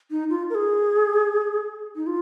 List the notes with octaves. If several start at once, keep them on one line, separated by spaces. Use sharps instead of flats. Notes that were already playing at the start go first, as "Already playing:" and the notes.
D#4
F4
A#4
G#4
D#4
F4